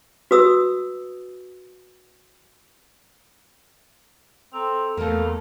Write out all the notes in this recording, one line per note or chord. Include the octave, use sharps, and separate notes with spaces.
F#4 B4 D#6 E6
C4 A4 A#5
E2 A3 A#3 F5